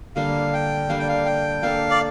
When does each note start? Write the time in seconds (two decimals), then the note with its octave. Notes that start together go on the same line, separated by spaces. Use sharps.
0.16 D3 G3 A#3 D4 F5
0.53 G5
0.89 D3 G3 A#3 D4 F5
0.99 G5
1.08 F5
1.26 G5
1.63 A#3 D4 A4 F5
1.91 D5